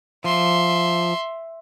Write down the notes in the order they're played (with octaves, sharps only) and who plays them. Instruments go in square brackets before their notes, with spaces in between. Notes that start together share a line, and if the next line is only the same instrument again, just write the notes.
[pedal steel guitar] F3 [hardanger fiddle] E5 C6